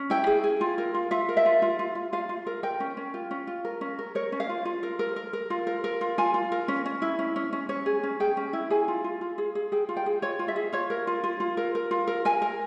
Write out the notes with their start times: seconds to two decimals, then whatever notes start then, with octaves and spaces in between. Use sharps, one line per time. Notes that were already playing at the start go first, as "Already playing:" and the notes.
Already playing: C#4
0.10 E4 G5
0.27 G#4
0.44 G#4
0.61 F4
0.78 A#4
0.94 F4
1.11 F4 E5
1.29 A#4
1.37 E5
1.46 F4
1.62 F4
1.79 F4
1.95 F4
2.13 F4 F5
2.29 F4
2.47 A#4
2.63 A#4 G5
2.80 C#4
2.97 C#4
3.14 F4
3.31 C#4
3.47 F4
3.65 A#4
3.81 C#4
3.99 A#4
4.15 A#4 C#5
4.32 C#4
4.40 F5
4.49 F4
4.65 F4
4.83 A#4
4.99 A#4
5.16 A#4
5.33 A#4
5.50 F4
5.67 A#4
5.84 A#4
6.01 F4
6.18 F4 G#5
6.34 F4
6.52 A#4
6.68 C#4
6.86 C#4
7.02 E4
7.19 C#4
7.36 C#4
7.53 C#4
7.69 C#4 C#5
7.86 G#4
8.03 C#4
8.20 G#4 G5
8.37 C#4
8.53 E4
8.70 G#4 G#5
8.88 F4
9.04 F4
9.21 F4
9.38 G#4
9.55 G#4
9.72 G#4 G5
9.89 F4
9.97 G5
10.06 G#4
10.22 F4 C#5
10.39 F4
10.48 E5
10.56 G#4
10.73 F4 C#5
10.90 A#4
11.07 F4
11.24 F4
11.40 F4
11.57 A#4
11.75 A#4
11.91 F4
12.07 A#4
12.25 A#4 G#5
12.42 A#4